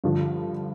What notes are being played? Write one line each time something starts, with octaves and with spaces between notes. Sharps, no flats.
G2 D3 F3